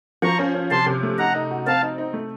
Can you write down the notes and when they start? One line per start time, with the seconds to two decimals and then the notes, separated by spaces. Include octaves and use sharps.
0.22 F3 A#5 C#6
0.39 C#4
0.54 C#4
0.70 C3 A5 C6
0.86 C3
1.03 A3
1.18 D#4 F#5 A#5
1.34 D#4
1.51 F#4
1.66 C4 F5 A5
1.82 D#4
1.98 D#4
2.13 A3